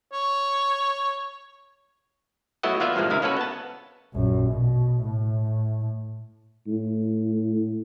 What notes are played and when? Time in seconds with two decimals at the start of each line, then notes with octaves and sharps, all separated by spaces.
0.13 C#5
2.63 F#3 A3 B3 E4 F#4 D#5
2.80 E3 A#3 B3 F4 D5 E5
2.96 G2 A#2 F3 G#3 A#3
3.10 C#2 C3 D#3 E4 F5
3.22 A#3 C#4 F#4 A4 B4
3.37 B3 A5
4.14 A#1 F#2
4.50 B2
5.02 A2
6.67 A2